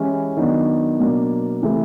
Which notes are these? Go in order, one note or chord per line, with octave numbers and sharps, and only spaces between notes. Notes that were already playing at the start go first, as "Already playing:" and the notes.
Already playing: E3 G#3 C#4 E4 G4
D#3 F#3 B3 D4
B2 F#3 A#3 D4
C3 E3 A3